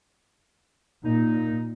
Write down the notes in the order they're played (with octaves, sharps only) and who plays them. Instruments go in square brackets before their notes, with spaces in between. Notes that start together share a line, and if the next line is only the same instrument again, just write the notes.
[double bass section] A#2 [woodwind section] D#4